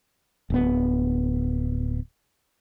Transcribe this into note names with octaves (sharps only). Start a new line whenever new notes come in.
D1 B3